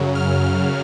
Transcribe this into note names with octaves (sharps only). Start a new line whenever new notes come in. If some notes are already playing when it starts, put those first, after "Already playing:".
Already playing: F#2 C#3 F#3
F6
F6